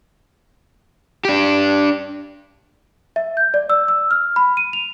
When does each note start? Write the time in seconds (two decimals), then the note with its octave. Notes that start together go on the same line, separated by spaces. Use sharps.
1.25 D4 G4
3.16 E5
3.37 G6
3.54 D5
3.70 E6
3.88 E6
4.11 F6
4.36 B5
4.57 D#7
4.73 F7